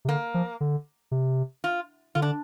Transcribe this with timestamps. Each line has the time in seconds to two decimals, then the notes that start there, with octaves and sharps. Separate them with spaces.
0.05 C3
0.08 D3 A#3
0.34 F3
0.61 D3
1.11 C3
1.64 F4
2.15 D3 F4
2.22 D4